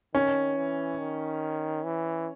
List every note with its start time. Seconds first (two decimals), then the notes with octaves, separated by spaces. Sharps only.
0.14 D#3 C#4
0.57 E3
0.99 D#3
1.84 E3